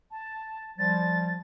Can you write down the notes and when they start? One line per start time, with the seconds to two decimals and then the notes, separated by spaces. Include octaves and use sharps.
0.11 A5
0.79 F3 G3 A6